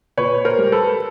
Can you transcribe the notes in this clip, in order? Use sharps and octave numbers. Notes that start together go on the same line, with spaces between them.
A#2 B4 C#5
A#4 C5
G3
A4 B4